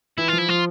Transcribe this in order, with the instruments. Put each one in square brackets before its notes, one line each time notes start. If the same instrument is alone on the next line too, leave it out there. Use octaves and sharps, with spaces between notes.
[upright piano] E3 [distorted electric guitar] E4
[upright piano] F3 [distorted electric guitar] F4
[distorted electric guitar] E4
[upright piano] F3 [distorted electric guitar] F4